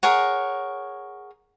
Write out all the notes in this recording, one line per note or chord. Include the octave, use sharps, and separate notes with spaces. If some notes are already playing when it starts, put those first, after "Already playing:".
G#4 A#4 C#5 F#5